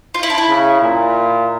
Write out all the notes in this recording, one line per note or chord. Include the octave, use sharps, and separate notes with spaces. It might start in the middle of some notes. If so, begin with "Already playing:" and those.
F4
E4
D4
E4
C#3
A#2